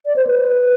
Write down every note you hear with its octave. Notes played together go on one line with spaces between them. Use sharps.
D5
C5
B4